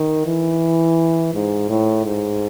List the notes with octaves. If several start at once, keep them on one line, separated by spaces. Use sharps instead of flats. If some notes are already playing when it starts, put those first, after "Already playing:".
Already playing: D#3
E3
G#2
A2
G#2